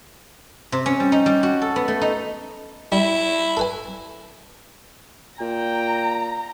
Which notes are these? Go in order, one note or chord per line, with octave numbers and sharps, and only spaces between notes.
C3
C#4
G3
D#4
G3
F#4
A4
B3
A3
D#4
G3 E4
A4 B4 G#5
A#2 G5 A#5